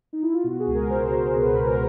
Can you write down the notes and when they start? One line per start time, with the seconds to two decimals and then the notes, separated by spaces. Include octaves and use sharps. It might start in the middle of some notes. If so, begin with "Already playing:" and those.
0.13 D#4
0.23 E4
0.34 F4
0.44 B2 F#4
0.60 G#4
0.67 C#2
0.74 A#4
0.90 B2 C5
1.13 C#2
1.36 B2 B4
1.52 A#4
1.59 C#2
1.67 A#4